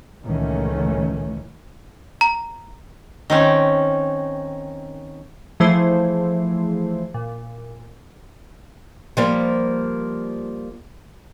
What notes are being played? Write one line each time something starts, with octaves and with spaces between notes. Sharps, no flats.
C#2 A#2 D#3 E3 A3 C#4
A#5
D#3 C4 C#4
E3 F3 A3 E4 G#4 C5
A#2
F3 G3 A#3